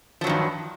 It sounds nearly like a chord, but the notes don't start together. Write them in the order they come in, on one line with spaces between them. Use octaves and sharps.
F3 F#3 D#3 G2